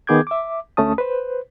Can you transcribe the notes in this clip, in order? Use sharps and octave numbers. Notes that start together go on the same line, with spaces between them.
D#3 B3 G#4 D6 G6 G#6
E5 D6
D2 A3 C#4 A5 D#6
B4 C5